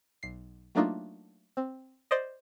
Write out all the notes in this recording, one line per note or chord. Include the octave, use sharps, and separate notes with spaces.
B1 C7
F#3 A3 A#3 D4 D#4 F4
C4
C5 D5 D#5